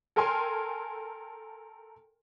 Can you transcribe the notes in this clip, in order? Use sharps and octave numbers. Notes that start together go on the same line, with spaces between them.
A4 A#4 G5 G#5 C6 F6